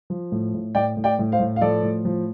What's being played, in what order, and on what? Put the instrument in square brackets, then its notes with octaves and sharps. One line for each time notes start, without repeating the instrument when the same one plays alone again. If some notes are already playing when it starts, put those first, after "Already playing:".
[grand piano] F3
A2
A2
A2 D5 G5
A2
D5 G5
A2
C5 F5
A2
F5
F3 A4 D5
A2
F3